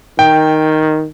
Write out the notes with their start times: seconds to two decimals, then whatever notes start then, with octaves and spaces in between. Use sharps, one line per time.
0.19 D#3 G5